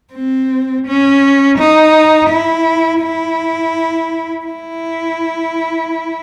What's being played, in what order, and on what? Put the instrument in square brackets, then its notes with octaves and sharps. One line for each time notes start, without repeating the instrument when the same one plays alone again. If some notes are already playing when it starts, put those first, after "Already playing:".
[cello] C4
C#4
D#4
E4
E4
E4